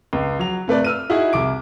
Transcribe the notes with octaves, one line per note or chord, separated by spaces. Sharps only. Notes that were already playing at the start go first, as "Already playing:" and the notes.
C#2
F#3 F7
C3 A3 B4 D5
E6 F6 D#7
D#4 E4 F#4 G#4
C2 D6 D7